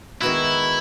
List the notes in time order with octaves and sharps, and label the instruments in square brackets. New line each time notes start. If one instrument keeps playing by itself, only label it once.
[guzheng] D#3 G#3 B3 D#4 F#4 [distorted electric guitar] E4